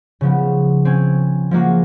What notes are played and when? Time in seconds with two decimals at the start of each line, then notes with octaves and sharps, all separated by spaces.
0.21 C#3 F3 B3
0.85 C4 C#4 G#5
1.51 F3 G#3 A#3 F#4